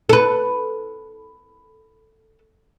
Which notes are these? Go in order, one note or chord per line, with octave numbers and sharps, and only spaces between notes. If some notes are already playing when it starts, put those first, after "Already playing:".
A4 B4